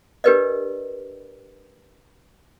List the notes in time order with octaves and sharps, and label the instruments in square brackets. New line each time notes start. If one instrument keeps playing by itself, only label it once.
[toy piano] D4 G4 A#4 B4 D5 D#5